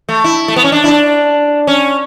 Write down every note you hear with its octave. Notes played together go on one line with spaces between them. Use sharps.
A3
E4
A3
B3
C#4
D4
E4
D4
C#4